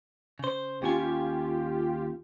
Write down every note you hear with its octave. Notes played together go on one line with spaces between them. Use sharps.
C#3 C5
D#2 C#4 F4 G4 G#5